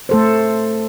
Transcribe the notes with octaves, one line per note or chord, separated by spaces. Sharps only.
A3 A4 C5